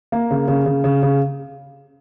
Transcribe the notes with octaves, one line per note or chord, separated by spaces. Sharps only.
A#3
C#3
C#3
C#3
C#3
C#3